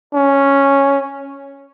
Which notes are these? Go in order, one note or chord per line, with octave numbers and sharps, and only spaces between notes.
C#4